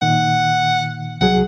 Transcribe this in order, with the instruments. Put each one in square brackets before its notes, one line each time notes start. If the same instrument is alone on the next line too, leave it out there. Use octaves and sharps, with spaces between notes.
[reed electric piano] A#2 D#3 [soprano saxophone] F#5
[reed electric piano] C2 F#3 G#4 [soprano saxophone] F#5